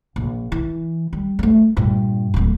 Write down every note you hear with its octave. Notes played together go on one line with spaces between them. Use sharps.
A#1
E3
G3
G3 A3
G2 A#2
D1 F#3